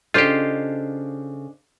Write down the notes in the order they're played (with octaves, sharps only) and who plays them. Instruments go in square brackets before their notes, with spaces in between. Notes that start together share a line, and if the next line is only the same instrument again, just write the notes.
[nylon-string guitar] C#3 A4 [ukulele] D4 C5 D#5 [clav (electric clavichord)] F4 G4